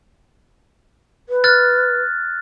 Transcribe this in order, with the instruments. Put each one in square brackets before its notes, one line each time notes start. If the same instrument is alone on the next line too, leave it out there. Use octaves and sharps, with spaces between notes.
[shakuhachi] B4
[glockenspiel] F6 F#6 A6